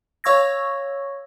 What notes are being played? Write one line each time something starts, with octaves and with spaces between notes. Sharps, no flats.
C#5 F5 C#6 E6 G#6 A#6